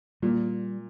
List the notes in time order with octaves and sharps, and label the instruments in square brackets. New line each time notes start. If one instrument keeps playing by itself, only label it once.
[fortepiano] A#2 [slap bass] G3